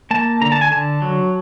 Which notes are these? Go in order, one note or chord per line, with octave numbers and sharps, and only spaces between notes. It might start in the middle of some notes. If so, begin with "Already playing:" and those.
A#3 A5
D3 A#5
A5
G#5
D3 A5
F#3